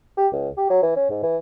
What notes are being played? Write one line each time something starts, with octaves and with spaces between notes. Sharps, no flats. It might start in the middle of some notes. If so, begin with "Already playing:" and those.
G4
C#2
G4
F#3
E3
C#4
G#2
E3